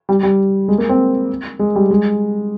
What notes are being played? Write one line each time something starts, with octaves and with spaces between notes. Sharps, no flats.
G3
G3
G#3
A#3
C4
G#3
G3
G#3